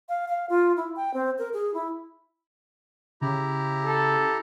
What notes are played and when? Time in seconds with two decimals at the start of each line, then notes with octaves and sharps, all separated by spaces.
0.09 F5
0.28 F5
0.49 F4
0.77 E4
0.96 G5
1.14 C4
1.38 A#4
1.53 G#4
1.74 E4
3.21 C#3 E4 G4 A#5
3.84 A4